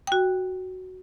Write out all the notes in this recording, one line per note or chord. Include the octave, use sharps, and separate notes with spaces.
F#4 G5